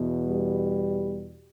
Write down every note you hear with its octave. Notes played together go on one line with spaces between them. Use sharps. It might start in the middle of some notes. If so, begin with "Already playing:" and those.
Already playing: E2 B2
G3